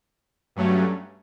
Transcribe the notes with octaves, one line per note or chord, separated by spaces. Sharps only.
G2 F#3 A3 C#4